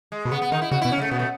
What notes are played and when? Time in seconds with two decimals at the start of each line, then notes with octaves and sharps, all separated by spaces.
0.12 G#3
0.25 B2
0.32 C#3 B3
0.42 B3
0.52 D#3 D#4
0.62 E4
0.71 C#3 F#4
0.82 B2 E4
0.92 C#4
0.98 C#3
1.01 A3
1.11 B2 B3
1.19 A3